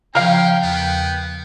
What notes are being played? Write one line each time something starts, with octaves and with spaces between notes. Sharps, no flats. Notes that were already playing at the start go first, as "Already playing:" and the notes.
C#3 F3 C#4 A#4 F5 G5
E2 B3